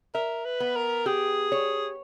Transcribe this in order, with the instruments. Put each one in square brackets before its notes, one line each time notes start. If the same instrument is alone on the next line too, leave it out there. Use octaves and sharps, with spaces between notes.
[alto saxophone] A#4 [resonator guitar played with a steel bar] E5
[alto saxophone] B4
[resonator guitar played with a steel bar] B3
[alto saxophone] A#4
[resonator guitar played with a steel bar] G4 [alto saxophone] G#4
[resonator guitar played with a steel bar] C#5